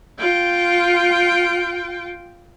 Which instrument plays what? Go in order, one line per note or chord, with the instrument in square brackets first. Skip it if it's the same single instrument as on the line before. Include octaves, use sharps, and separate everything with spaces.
[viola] F4 G5